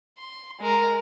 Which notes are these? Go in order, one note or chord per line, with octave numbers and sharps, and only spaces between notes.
C6
G#3 A#4